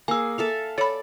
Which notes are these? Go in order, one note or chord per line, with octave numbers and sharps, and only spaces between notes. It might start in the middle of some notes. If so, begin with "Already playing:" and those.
A#3 G#4 G#5 E6
A4 E5 F5
A4 C#5 D5 B5